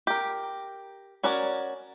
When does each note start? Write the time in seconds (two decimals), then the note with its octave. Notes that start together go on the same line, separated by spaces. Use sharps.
0.07 G4 A#4
1.23 C#4 F#4 A#4 C#5 D5